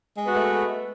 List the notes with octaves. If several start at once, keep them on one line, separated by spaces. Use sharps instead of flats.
G#3 A3 B3 F#4 B4